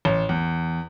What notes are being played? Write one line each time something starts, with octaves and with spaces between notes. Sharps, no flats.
A1
E2